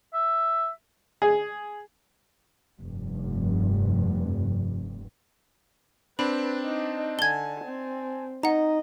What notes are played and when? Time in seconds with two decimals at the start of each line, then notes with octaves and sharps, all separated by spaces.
0.14 E5
1.22 G#4
2.79 F1 G2
6.19 C4 D4 B4 B5
6.65 D#4
7.19 D3 G#5 A5 G#6 G7
7.65 C4
8.43 D#4 D#5 F#5 A#5